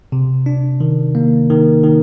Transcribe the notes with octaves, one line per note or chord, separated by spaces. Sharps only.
C3
D4
D#3
A#3
D#3
D#3